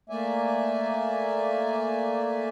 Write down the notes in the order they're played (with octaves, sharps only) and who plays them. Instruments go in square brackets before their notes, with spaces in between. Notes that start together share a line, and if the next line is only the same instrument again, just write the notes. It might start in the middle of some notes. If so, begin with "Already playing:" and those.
[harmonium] A3 A#3 D5 E5 G#5